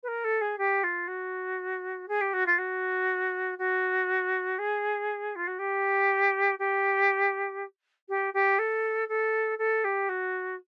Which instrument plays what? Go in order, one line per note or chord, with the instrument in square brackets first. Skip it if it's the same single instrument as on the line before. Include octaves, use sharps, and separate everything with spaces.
[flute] B4
A#4
A4
G#4
G4
F4
F#4
G#4
G4
F#4
F4
F#4
F#4
G#4
F4
F#4
G4
G4
G4
G4
A4
A4
A4
G4
F#4